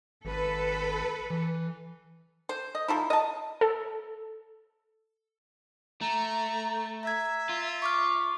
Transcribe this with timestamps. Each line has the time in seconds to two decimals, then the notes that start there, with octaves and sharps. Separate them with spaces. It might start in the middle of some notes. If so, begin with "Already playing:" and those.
0.25 G#1 A4 B4
1.30 E3
2.49 C5
2.75 D#5
2.88 F3 D#4 E4
3.10 D#5 A5
3.61 A4
6.01 A3 A#5
7.03 E5 A#5 G#6
7.49 F4
7.82 C#6 D6 F6